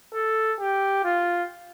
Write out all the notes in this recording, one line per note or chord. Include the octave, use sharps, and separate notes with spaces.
A4
G4
F4